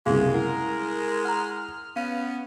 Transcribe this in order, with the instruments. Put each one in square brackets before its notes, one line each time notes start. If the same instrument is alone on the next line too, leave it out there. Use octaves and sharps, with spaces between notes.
[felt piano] F#1 C2 [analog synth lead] B2 [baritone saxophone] G#3 [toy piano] G#4 F5
[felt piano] E4 [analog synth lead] A#4 [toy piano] F#5
[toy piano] F#5 A#5 [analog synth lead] F6
[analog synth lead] B3 [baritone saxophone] C#4 [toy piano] F5